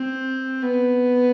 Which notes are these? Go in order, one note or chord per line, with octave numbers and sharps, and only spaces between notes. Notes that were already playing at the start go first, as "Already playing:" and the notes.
Already playing: C4
B3